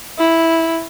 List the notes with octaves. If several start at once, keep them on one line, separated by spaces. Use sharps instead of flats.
E4